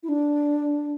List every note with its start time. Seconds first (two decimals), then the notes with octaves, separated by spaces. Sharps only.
0.03 E4
0.09 D4